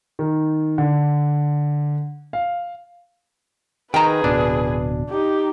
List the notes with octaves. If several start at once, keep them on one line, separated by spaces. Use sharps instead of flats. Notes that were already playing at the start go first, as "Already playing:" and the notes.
D#3
D3
F5
D#3 G#4 B4 G5 A#5
D1 B2 D4
D#4 G4